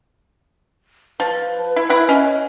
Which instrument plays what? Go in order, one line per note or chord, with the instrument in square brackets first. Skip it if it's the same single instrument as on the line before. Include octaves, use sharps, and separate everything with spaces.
[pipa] F3 [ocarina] B4
[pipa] E4
E4 F#5
[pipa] C#4 [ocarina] D#5